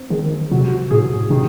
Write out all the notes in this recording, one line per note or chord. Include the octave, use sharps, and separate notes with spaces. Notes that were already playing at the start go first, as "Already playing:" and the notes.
Already playing: C4
D#3 G#4
C3 F#3
A2 G#4
C3 D#3